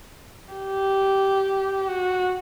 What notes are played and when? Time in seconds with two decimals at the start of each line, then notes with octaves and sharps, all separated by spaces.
0.53 G4
1.88 F#4